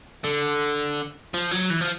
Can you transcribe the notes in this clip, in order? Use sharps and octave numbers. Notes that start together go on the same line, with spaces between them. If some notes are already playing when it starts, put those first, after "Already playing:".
D3
F3
F#3
E3
F3